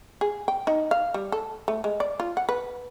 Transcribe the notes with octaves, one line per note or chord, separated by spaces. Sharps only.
G#4
G5
D#4
F5
G3
A4
A3
G#3
D5
F4
F#5
B4